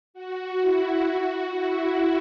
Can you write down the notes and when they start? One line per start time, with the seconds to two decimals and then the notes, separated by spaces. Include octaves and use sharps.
0.14 F#4
0.60 E4
1.07 F#4
1.54 E4